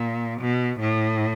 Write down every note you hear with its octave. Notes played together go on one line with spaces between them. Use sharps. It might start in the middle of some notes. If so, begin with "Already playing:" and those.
Already playing: A#2
B2
A2